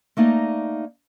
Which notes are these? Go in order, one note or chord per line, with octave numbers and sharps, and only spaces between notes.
A3 A#3 D#4 D5 D#5